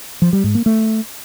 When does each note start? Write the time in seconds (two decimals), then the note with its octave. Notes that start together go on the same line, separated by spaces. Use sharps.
0.22 F3
0.33 G3
0.44 G#2
0.55 A#3
0.66 A3